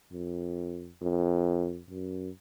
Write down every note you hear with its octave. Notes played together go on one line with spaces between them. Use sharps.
F2
F2
F#2